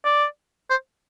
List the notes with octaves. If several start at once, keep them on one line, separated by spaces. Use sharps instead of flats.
D5
C5